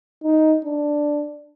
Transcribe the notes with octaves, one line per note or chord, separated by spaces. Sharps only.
D#4
D4